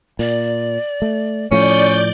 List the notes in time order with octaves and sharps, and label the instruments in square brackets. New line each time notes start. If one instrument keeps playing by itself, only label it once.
[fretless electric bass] A#2 [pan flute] D5
[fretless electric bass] A3
[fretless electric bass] A2 F3 A3 [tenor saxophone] C#4 [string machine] D5 G6